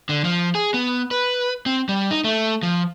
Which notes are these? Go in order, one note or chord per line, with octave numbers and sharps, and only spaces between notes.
D3
F3
G#4
B3
B4
C4
G3
D#4
A3
F3